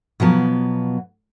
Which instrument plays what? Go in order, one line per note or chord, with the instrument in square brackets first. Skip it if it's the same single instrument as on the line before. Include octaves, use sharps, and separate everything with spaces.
[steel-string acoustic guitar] B2 F3 F#3 B3